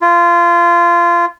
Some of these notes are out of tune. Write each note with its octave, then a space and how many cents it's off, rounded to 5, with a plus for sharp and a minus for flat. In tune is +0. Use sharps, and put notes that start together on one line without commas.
F4 -20